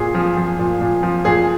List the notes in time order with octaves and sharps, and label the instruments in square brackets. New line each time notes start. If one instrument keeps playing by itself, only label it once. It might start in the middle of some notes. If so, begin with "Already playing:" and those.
Already playing: [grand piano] A#2 G#4
F3
F3
A#2
A#2
F3
A#2 G#4